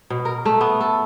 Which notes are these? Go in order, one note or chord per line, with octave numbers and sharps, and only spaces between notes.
B2
A#4
A3
B3
A4